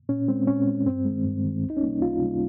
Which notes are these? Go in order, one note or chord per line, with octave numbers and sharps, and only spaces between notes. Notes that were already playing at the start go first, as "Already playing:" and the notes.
A#2 C#4
G#3 C4
A#2 C#4
G#3
G2 C4
D#3 G#3
G2
D#3 G#3
C#2
D#4
C#4
C3 G3 A#3
C#2 F4
C3 G3 A#3